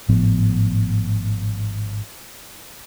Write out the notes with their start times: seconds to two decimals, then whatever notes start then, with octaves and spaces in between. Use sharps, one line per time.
0.08 G#1 A2 F3 B3